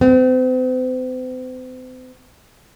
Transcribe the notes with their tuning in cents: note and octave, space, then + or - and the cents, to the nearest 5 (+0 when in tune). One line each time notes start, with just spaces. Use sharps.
C4 -40